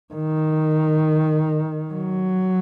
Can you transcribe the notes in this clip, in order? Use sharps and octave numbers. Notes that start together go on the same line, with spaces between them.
D#3
F#3